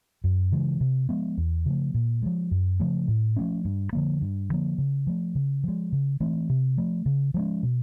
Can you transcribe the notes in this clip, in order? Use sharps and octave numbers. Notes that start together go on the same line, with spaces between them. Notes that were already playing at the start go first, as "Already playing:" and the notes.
F#2
C#3 E3 G#3
C3
F3 G#3 B3
E2
C#3 F3 A3
A#2
F3 G#3
F#2
C#3 F3 A3
A2
F3 A3 C#4
G2
D3 F3 A#3
G2
D3 F3 A#3
C#3
F3 A3
C#3
F3 G#3
C#3
E3 A3 C4
C3
F3 A3
C#3
F3 G#3 C#4
B2